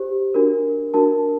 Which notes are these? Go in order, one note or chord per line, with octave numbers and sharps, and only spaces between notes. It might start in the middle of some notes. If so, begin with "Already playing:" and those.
Already playing: G4 C5
D4 F#4 A#4
D4 F#4 A#4 A5